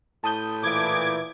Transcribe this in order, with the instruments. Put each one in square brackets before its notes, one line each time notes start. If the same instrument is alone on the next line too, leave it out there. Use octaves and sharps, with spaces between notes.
[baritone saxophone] A2 [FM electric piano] A5 D#6 G6
[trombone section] A#2 E3 [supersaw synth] D6 G#6